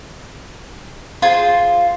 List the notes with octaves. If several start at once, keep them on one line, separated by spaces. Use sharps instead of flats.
F4 G#4 C5